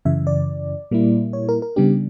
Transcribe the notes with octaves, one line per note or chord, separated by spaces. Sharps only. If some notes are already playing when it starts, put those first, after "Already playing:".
F#2 C#3 E3 E5
D5
A#2 G3 A#3 E4
C#5
A#4
A#4
C#3 G3 B3 D4 G4